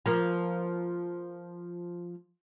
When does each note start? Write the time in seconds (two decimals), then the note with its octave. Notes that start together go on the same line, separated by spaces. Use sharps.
0.06 F3 A#3